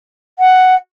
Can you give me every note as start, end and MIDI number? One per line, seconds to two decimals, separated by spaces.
0.39 0.75 78